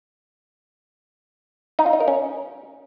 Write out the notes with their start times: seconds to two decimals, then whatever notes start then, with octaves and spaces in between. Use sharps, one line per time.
1.79 D#4
1.86 F4
1.93 D#4
2.00 A#4
2.08 C#4